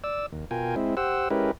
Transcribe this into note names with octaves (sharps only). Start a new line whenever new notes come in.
D5 E6
D#2
B2 F4 A#4 G5 G#5
G#3 C4 E4
G4 C5 F#5 E6
G#3 C#4 E4 G4 A#4 B4